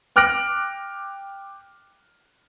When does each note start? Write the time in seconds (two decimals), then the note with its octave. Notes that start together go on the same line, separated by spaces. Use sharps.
0.16 G5 D6 F6 F#6 A#6 D7